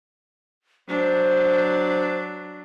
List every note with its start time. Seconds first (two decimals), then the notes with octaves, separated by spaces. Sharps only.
0.88 F#3 D4 C5